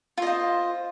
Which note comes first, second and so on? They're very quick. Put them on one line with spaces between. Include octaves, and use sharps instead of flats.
F4 D#5 C5